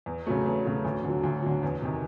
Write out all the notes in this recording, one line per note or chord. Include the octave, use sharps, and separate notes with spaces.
E2
C#3 F#3 A3
E2
C#3 F#3 A3
D2
D3
F#3
D2
D3 F#3
E2
C3 D#3